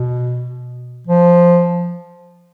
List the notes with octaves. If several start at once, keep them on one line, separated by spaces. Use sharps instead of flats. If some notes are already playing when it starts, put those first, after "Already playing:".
Already playing: B2
F3